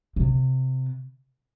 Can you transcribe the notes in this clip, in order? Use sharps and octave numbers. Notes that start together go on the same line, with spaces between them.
C3